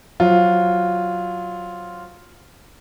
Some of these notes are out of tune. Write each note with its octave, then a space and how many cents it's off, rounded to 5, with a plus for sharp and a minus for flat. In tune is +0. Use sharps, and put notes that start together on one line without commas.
F#3 +0 F4 +0 C5 +10